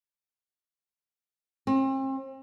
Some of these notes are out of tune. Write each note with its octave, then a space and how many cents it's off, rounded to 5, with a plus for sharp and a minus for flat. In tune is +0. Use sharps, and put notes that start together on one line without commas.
C4 +40